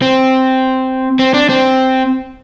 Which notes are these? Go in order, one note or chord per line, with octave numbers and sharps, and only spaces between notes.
C4
C4
D4
C4